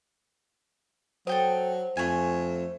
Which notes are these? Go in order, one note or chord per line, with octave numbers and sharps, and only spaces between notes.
F#3 A4 C5 G5 D#6
F2 A3 G#5